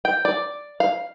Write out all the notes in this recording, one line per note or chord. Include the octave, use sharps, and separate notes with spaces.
G5
D5
F5